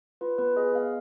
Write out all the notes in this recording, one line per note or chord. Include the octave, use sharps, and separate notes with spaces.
F4 B4
B3 B4
G#4 D#5
B3 F5